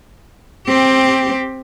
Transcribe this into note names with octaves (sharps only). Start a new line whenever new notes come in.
C4 G4